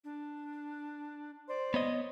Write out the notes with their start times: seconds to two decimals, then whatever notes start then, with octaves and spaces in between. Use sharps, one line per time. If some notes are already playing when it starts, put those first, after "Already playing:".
0.04 D4
1.49 C5 D5
1.74 B3 C#5 D#5